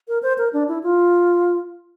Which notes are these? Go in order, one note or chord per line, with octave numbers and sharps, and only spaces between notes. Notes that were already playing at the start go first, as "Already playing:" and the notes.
A#4
C5
A#4
D4
E4
F4